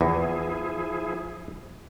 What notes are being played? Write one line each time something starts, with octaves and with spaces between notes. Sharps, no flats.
E2 F3 E4 G#4